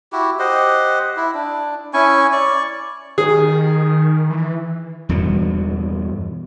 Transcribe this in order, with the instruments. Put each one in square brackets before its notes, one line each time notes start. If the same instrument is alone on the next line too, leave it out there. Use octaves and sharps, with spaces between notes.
[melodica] E4 F#4 G4
G4 C5 D#5 F#5
E4
D4
C#4 E4 G#5 C#6
D5 C#6
[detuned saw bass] D#3 [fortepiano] G#4
[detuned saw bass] E3
[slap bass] E2 G2 B2 D3